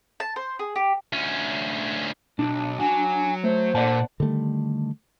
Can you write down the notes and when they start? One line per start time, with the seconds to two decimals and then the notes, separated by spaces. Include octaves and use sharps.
0.20 A5
0.36 C5
0.59 G#4
0.76 G4
1.13 D2 C#4
2.39 B1 D4
2.79 F#3 G#5
3.44 A3 C5
3.75 A#2 D5 F#5 A5
4.20 D3 D#3 G3 A3